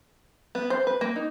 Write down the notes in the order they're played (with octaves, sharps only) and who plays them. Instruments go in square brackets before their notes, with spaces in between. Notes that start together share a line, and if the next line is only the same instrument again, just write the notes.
[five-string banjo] B3
C5
B4
A#3
D#4